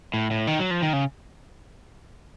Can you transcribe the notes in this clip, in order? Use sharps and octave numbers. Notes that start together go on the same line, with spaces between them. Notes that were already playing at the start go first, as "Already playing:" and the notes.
A2
A2
D#3
F#3
F3
D#3
C#3